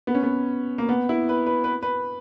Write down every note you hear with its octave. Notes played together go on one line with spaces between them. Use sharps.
B3
C#4
B3
A#3
B3
E4
B4
B4
B4
B4